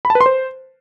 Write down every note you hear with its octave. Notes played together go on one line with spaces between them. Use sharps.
B5
A5
B4
C6
C5